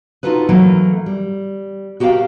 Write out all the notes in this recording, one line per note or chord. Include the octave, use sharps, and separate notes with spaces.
D#4 F4 F#4 A4 B4
E3 F#3 A3 A#3
G3
F#4 G4 A#4 C#5 F5 G5